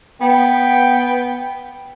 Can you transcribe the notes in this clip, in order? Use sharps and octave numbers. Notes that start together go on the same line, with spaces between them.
B3 G5